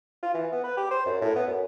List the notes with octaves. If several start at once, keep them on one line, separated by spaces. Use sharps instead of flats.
F4
E3
B3
B4
G4
C5
F#2
A2
B3
F#2